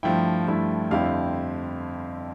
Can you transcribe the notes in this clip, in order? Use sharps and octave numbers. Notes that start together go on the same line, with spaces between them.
G2 F3 A3 E4 G5
G2 F3 A3 E4
F2 D3 G3 C4 E4 F5